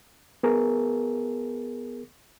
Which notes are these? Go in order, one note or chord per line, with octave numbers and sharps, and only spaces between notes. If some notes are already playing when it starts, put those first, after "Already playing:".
B3 G#4 A#4